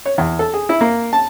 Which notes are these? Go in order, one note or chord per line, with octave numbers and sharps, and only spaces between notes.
C#5
E2
A4
G#4
E4
A#3
A5